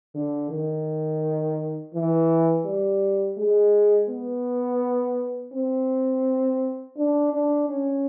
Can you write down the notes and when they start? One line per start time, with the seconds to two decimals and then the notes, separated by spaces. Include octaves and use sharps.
0.15 D3
0.50 D#3
1.94 E3
2.65 G3
3.38 G#3
4.09 B3
5.53 C4
6.97 D4
7.33 D4
7.69 C#4